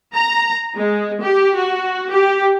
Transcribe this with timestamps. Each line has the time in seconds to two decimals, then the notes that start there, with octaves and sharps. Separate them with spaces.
0.14 A#5
0.76 G#3
1.22 G4
1.55 F#4
2.10 G4